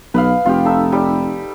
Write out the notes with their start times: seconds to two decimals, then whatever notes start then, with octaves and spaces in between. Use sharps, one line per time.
0.14 B1 B4 D#5 F5
0.45 F1 F4 G4
0.65 D#4 A4 E5
0.92 G3